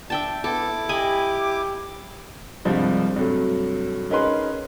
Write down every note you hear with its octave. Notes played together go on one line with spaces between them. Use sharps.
D4 E5 G5 A5
B3 E4 A4 D6
G4 D#5 G#5 B5
C2 G2 F3 G3 G#3
G2 C3 F#3 A3
C#4 D#4 G#4 A#4 B4 C6